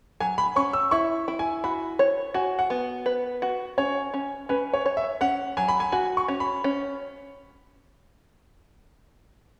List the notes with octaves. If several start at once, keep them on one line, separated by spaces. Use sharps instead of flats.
F#3 G#5
B5
C#4 C#6
E6
E4 C#6
E4
G#5
F#4 B5
C#5
F#4 G#5
F#5
B3
B4
F#4
C#4 C#5
C#4
C#4 B4
C#5
C#5
E5
C#4 F#5
F#3 G#5
B5
G#5
F#4 G#5
C#6
C#4
B5
C#4